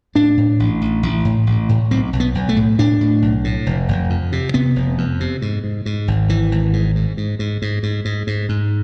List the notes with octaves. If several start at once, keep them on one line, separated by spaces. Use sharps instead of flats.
A2 D4
A2
A1
A1
A1
A2
A1
A2
B1 C4
B1
B3
B1
A3
A2
A2 D4
A2
B1
A2
F1
F1
F2
C3
C3 B3
F1
F2
C3
G#2
G#2
G#2
G#1
G#1 E3
G#1
G#2
G#2
G#2
G#2
G#2
G#2
G#2
G#2
G#2